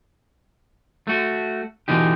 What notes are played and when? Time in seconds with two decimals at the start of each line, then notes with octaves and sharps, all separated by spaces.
1.07 A3 F#4
1.88 B2 D3 E3 D#4 G4